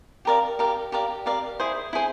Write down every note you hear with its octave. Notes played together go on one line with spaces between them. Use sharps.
G4 A#4 D5 F5
G4 A#4 D5 F5
G4 A#4 D5 F5
G4 A#4 D5 F5
E4 G#4 C5
E4 G#4 C5